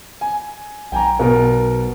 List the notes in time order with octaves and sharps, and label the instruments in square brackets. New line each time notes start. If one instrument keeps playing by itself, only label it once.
[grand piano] G#5
[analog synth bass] B1 [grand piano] G5 G#5 A#5
[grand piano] B2 B3 A#4